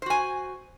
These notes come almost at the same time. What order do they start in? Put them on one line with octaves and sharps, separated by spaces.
C5 F#4 G#5